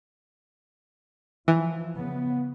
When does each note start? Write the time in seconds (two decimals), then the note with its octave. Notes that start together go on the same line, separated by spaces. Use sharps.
1.48 E3 F3
1.94 C#3 B3